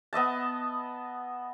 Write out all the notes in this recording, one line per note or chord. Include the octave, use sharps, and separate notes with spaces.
B3 D#5 E5 A5